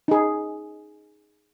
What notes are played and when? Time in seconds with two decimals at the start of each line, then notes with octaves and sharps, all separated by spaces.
0.08 D#4 G#4